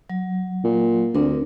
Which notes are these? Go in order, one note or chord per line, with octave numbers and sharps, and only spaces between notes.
F#3
A#2
D2 C4 D4 A#4